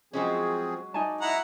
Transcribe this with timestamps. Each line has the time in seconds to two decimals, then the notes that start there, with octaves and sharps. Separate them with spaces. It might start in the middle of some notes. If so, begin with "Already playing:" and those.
0.13 F3 F#3 G#3 C4 C#4 G#4
0.94 D#4 D5 G#5 A5
1.21 E4 D#5 E5 F#5 A#5